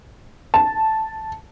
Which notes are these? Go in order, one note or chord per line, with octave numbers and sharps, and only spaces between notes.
A5